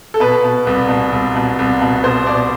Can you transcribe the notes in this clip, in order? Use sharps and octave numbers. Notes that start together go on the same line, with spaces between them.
A4
B2 B4
B2
C2
B2
C2
B2
C2
B2
B2 C5
B2 D5